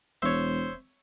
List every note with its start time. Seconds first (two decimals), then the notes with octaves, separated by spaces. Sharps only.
0.22 E1 C5 C#5 E5